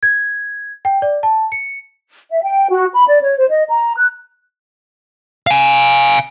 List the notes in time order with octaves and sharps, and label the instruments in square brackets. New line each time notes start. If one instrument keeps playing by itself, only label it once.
[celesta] G#6
G5
D5
A5
C#7
[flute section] E5
G5
F#4
B5
D5
C#5
C5
D#5
A#5
F#6
[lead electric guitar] F5 G#5